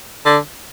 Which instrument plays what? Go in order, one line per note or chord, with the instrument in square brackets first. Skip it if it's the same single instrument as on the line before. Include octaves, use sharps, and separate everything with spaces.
[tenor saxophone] D3